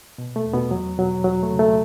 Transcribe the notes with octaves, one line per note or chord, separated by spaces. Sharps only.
B2
A3
E2
B2 B3
E2 F#3
B2 F#3
E2 F#3
A3
C#3
A3